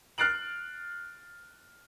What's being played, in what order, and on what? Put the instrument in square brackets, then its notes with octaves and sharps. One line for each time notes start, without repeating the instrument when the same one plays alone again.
[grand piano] F6 F#6 A6 C7 D7 F#7